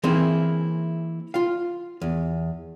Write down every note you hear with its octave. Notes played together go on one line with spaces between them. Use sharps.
E3 A#3 C4 D#4 E4 G#4
F4 F5
E2